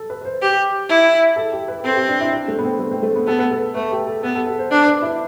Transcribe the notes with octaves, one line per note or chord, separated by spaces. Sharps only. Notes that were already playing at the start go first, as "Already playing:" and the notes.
Already playing: A4
B4
B4
C5
G4
E4
A4
G4
B4
G4
C4 A4
G4
D4
E4
D4
A3
B3
C4
A3
C4
A3
B3
B3 A4
B4
A4
A3 B4
G4
A4
B3 A4
A4
A4
C5
D4 C5
B4
E4